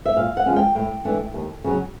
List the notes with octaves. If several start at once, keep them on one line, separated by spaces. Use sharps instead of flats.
E5
A#2 F5
F#5
F3 G#3 C#4
G5
A2 G5
E3 A3 D4
D#2
C#3 F#3